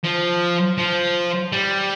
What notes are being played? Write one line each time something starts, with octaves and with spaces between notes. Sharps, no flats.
F3
F3
G3